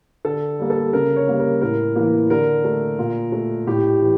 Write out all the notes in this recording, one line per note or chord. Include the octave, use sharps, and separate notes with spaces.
D3 A4
G3 A#3
A4
C#3 A#4
C#5
G3 A#3
A#4
A2 A#4
E3 A#3
D3 A#4
A3
A#2
A3
A2 G4
E3